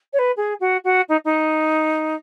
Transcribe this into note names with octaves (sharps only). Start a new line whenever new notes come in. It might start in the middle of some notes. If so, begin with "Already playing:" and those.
C#5
B4
G#4
F#4
F#4
D#4
D#4